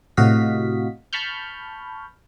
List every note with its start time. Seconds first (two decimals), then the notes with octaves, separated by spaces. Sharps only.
0.17 A2 C3 F#4 D#5 F5 B6
1.13 A5 B5 C#6 F6 G6